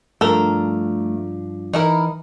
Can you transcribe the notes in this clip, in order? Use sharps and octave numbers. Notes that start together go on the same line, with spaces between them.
G2 F3 A3 D4 A4 A#4
E3 D#4 E4 A#4